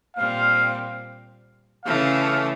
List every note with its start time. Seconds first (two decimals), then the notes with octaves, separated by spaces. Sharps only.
0.17 A#2 G3 C4 F5
1.86 C#3 E3 A3 F5